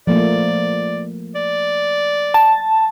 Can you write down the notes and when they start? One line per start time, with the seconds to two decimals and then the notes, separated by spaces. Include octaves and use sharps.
0.07 F3 A3 A#3 D5
1.35 D5
2.34 A5